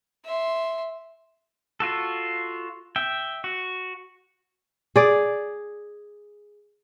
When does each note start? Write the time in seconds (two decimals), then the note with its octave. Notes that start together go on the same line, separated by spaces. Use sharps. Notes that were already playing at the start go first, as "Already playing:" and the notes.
0.25 E5 C6
1.80 F4 F#4 A4
2.96 E5 G5
3.44 F#4
4.96 G#4 D5